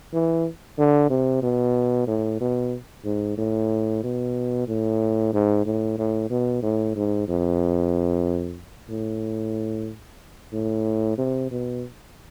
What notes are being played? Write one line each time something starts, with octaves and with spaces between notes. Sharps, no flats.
E3
D3
C3
B2
A2
B2
G#2
A2
B2
A2
G#2
A2
A2
B2
A2
G#2
F2
A2
A2
C3
B2